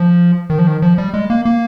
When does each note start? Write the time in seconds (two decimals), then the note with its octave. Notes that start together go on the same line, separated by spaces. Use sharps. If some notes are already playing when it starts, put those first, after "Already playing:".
Already playing: F3
0.50 D#3
0.59 F3
0.67 D#3
0.82 F3
0.98 G3
1.14 G#3
1.30 A#3
1.45 A#3